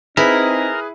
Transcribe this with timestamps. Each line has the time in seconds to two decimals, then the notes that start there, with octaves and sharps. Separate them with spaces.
0.17 C4 D#4 E4 G#4 A#4 B4